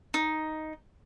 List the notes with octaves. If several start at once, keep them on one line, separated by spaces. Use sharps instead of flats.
D#4